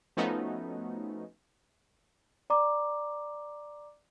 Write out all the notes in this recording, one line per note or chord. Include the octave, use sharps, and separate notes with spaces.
F3 A3 B3 C#4 D#4 F#4
D5 A#5 D6